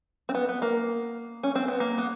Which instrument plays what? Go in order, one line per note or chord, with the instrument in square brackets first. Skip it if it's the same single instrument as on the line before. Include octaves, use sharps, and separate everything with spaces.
[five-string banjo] C4
B3
B3
A#3
C#4
C4
B3
A#3
B3